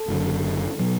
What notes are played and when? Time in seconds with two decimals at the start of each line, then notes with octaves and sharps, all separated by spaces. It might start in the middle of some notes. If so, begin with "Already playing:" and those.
Already playing: A4
0.08 F#1 F#2 D3 F#3
0.79 B2 F#3